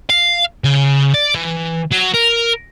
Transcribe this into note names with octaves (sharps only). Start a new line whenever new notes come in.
F5
C#3
D5
E3
F#3
A#4